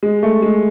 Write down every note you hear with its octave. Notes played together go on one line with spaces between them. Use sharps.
G#3
A3
G#3